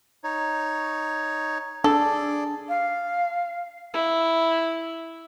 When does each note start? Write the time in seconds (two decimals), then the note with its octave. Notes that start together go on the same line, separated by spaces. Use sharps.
0.24 D#4 C#5
1.84 D4 G#4 A4 D5
2.68 F5
3.94 E4